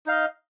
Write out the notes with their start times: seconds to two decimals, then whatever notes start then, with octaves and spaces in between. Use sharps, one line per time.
0.06 D#4
0.09 F5
0.11 D#5